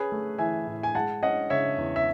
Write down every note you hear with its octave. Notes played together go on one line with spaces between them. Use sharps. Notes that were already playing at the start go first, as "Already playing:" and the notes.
Already playing: C#4 G#4 B4
A3
E3 E5 G#5
A2
G#5
G#3 F#5 A5
C#4 D#5 F#5
C#3 C#5 E5
E2
E5